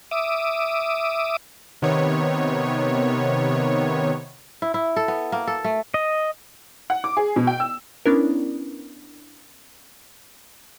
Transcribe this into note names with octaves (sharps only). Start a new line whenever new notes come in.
E5 D6 D#6
C3 D#3 B3 C#5
E4
E4
A4
B3
A#3
A4
A3
D#5
F#5
D6
G#4
B2
G5
E6
B3 C#4 D4 E4 A#4